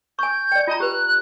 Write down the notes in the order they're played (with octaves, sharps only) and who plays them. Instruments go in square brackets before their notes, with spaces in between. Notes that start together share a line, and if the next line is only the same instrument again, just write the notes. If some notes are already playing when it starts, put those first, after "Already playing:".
[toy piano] G#5 C#6 [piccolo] G6
[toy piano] D5 G5
[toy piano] F4 A#5 [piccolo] D#5
[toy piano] G4 B4 [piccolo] F#6
[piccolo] F#6